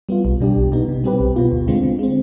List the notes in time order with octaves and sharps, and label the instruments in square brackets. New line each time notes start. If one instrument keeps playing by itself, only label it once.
[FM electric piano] G3 B3 F4
B1
B2 G3 D4 G4
B1
B2 B3 D#4
C3
G3 C4 G4 B4
B1
B2 B3 F4
D2
D3 G#3 C4 F4
D3
G#3 C4